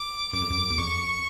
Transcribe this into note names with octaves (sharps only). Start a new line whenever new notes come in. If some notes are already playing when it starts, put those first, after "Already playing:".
Already playing: D6
F#2 D6
F2
F#2
E2
F2 C#6